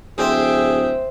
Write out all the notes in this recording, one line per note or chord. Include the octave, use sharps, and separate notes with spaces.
D1 C4 G#4 E5 G5